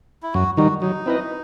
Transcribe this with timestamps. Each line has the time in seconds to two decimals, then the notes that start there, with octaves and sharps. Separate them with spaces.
0.23 E4
0.34 F#2 F#4
0.57 D#3 G3 D#4 F#4
0.81 F#3 D#4
1.06 C4 E4 B4 D#5